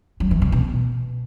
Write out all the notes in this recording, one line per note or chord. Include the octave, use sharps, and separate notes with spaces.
F#3
E3
C3
B2